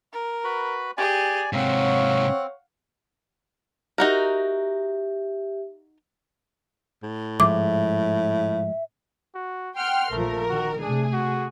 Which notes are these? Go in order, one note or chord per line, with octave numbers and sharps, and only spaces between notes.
A#4
F#4 B4 B5
G4 G#4 D5 G#5
G#2 C3 C4 C#5 F5 F#5
D#4 F#4 G4 A#4 E5
A2
G#2 F3 G#3 E5 D6
F#4
F#5 G5 C6 F6
A#1 F3 A3 A#4
D#3 F#4
C3 A3 D4 G#4
F#4